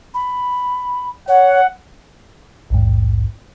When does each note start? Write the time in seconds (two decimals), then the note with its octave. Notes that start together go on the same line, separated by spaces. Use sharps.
0.14 B5
1.28 C#5 F#5
2.70 A#1 D#2 G#2